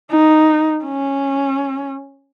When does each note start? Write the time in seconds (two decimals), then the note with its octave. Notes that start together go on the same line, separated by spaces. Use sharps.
0.11 D#4
0.85 C#4